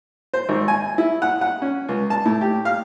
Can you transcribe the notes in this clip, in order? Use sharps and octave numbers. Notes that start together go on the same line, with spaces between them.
C5
G#1
G#5
E4
F#5
F#5
C#4
C#2
A5
A2
G4
F5